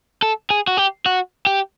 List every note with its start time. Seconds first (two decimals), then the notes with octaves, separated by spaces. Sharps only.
0.22 A4
0.50 G#4
0.67 F#4
0.77 G4
1.06 F#4
1.46 G4